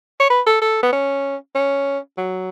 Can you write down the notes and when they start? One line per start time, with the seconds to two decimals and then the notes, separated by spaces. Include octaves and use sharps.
0.20 C#5
0.30 B4
0.47 A4
0.62 A4
0.83 B3
0.92 C#4
1.55 C#4
2.18 F#3